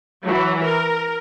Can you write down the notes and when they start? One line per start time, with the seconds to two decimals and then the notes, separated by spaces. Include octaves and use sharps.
0.24 E3 F#3
0.64 A#4